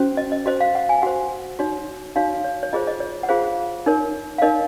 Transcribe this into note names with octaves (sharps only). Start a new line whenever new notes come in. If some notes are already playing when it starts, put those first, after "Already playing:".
Already playing: C#4 F#4 C5
D#5
D#5
F#4 C5 D#5
F5
F#5
G#5
F#4 C5 F#5
D#4 F#4 C#5
D#4 F#4 C#5 F5
C#5
C#5
F4 G#4 C5 D#5
D#5
C#5
F#5
F4 G#4 C5 F5
D#4 A#4 C#5
F5
D#4 A#4 C#5 D#5